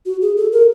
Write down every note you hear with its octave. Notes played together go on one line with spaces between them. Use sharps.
F#4
G#4
A4
A#4